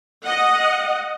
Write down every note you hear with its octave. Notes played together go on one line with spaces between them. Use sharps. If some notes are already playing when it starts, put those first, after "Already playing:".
D#5 F#5